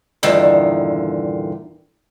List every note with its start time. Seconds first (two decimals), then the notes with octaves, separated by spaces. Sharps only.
0.23 E2 G2 A#2 D3 D#3